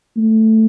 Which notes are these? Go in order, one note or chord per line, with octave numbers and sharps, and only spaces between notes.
A3